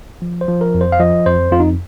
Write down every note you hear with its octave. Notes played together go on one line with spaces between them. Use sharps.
F3
C5
F3
A#4
F2
C5
F5
F3 D#5
F2 C5
F2 F4
D#4